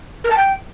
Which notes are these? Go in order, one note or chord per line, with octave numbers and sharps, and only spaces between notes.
A#4
A5
G5